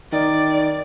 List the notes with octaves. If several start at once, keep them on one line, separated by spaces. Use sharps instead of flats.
D#3 D5